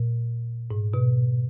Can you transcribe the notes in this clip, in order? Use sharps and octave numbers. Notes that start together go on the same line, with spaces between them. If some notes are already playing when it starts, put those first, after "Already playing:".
Already playing: A#2
G#2
B2